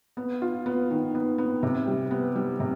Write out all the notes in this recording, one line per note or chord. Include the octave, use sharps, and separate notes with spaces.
B3
F4
B3
D#3
B3
B3
C3
G3
B3
G3
C3